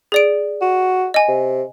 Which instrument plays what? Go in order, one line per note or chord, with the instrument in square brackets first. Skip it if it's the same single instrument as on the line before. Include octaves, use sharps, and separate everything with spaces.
[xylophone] G#4 D5 D7
[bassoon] F#4
[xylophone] D#5 G#5
[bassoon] C3